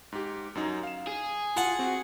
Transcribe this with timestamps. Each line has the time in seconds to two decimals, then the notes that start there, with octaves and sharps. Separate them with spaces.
0.12 G#2 G4
0.55 F#2 F#3 D#4
0.83 F5 E7
1.07 G#4
1.57 F4 F#5 A5
1.79 C4 F#4